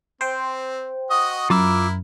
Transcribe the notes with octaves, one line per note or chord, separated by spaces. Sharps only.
C4 C5 G5
F#4 D#5 D#6
F#2 E4 F4 A#4 D6 E6